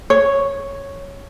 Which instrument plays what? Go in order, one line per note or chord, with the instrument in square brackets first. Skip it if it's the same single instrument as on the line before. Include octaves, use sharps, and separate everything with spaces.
[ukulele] C#5